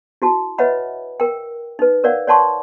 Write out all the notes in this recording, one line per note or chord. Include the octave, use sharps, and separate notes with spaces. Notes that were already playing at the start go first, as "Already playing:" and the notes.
E4 F#4 A5
B4 C#5 D#5 E5 F#5 B5
A#4 G5
D#4 B4
A#4 C#5 D5 F5 F#5
C#5 D5 F#5 A5 C6 C#6